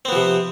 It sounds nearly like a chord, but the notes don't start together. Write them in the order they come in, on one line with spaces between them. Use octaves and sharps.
C4 B3 F3 C3